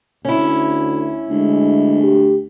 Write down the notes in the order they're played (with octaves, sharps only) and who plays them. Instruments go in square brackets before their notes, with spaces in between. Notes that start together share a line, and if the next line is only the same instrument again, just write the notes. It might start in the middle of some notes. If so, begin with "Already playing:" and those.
[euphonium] D2 [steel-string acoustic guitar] C#4 E4
[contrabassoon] D2 [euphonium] G#3
[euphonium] G4